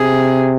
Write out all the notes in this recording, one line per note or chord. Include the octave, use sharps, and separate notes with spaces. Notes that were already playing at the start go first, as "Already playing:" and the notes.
Already playing: C3 G#4